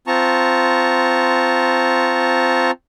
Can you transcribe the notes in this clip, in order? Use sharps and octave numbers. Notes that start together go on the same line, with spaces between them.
C4 F4 A5 A#5 C#6